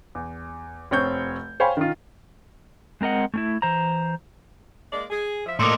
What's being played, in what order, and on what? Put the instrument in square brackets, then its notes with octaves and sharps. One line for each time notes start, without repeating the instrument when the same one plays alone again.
[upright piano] E2
F1 C4 C#5 G6
C5 C#5 F5 G5 G#5 B5
D#3 F4
[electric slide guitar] G#3 C4 A#4 D#5 F#5
A3 C#4 E4
E3 C5 A#5
[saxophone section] G#3 A#3 D5
G#4
F3 E5
[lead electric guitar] A2 A#3 [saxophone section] A4 D5 D#5 [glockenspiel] C6 D6